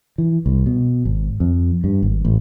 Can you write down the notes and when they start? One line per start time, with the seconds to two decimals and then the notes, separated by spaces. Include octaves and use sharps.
0.18 E3
0.46 C2
0.66 B2
1.05 G#1
1.40 F2
1.84 G2
2.02 G#1
2.25 A1